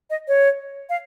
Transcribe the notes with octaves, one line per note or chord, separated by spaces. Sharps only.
D#5
C#5
F5